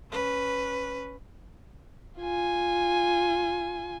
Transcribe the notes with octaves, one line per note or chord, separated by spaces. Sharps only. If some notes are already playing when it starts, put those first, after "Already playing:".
C#4 B4
F4 G#5